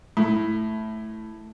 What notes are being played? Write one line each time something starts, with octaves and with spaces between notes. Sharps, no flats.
A2